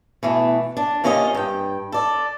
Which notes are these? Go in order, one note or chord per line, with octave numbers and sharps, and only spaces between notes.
B2 E3 A3
D4
C3 A#3 C#4 E4 F4 D#5
G2 G5
A4 D5